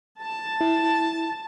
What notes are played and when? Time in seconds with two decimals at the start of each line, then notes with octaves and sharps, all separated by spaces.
0.22 A5
0.61 E4